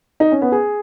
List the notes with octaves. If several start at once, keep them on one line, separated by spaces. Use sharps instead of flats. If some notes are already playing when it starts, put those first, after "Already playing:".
D#4
C#4
B3
G#4